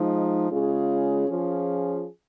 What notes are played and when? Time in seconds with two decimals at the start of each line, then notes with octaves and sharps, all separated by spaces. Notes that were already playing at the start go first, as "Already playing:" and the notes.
Already playing: F3 G#3 D#4
0.49 C#3 G#3 C#4 F4 G#4
1.28 F3 C#4 F4 G#4